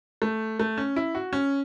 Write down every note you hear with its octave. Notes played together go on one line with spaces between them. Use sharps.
A3
A3
C#4
E4
F#4
C#4